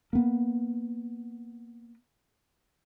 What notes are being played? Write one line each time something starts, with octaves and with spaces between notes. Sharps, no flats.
A#3 B3